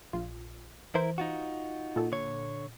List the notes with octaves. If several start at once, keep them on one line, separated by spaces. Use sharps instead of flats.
A#1 F4
E3 E4 A#4 C5
D#4 F4 F#4
A#2 A4
D3 C#5